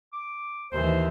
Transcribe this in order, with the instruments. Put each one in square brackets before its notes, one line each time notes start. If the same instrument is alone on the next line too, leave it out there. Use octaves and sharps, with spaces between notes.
[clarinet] D6
[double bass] D#2 E3 [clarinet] C5